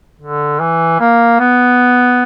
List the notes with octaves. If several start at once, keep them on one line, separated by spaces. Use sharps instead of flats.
D3
E3
A#3
B3